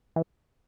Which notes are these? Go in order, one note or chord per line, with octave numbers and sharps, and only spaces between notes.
E3